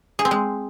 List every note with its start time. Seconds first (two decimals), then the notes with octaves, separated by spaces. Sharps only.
0.19 G#4
0.25 C4
0.31 G#3